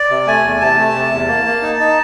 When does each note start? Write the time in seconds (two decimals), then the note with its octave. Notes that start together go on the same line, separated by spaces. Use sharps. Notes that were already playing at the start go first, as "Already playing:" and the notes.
Already playing: D5
0.10 C3
0.27 A3 G#5
0.43 E2
0.61 C3 A5
0.78 A3
0.95 C3
1.12 E2
1.28 A#3
1.45 A#3
1.62 D#4
1.79 D#4